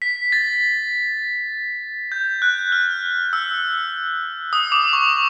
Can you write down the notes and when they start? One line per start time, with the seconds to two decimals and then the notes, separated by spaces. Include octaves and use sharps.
0.02 B6
0.32 A6
2.12 G6
2.42 F#6
2.72 F6
3.33 E6
4.53 D#6
4.72 D6
4.93 C#6